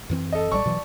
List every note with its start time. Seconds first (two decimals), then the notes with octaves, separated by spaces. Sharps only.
0.10 F#2 E3 C4
0.32 A4 D#5
0.52 A1 G3 D5 A5 C#6
0.65 B2 E3 F#3